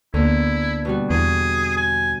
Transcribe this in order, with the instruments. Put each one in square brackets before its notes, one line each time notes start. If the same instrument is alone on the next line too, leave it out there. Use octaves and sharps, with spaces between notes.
[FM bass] D2 [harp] D3 A#3 B3 [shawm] E4
[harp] B2 G3 F#4
[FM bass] E2 [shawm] G#4
[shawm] G#5